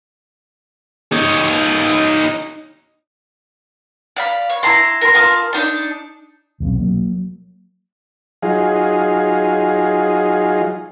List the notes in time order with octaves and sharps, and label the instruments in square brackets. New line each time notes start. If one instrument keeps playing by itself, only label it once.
[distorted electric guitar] D#4 C#5
[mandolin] D5 F5 B5
C#5
E4 A5 A#5 C6
A#4 C6
F4 A#4 A5 D#6
D4 D#4 A5
[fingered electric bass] D#1 B1 F#3 C4
F#3 A#3
[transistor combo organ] F#3 D#4 F4 G#4